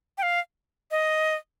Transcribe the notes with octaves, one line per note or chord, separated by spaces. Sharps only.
G5
F5
D#5